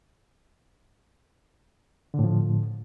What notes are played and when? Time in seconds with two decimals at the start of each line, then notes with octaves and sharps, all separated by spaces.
2.14 D3
2.19 A2
2.24 F3